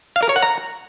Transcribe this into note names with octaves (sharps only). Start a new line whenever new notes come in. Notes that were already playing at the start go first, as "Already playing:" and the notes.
F5
A#4
C#5
F#5
A#5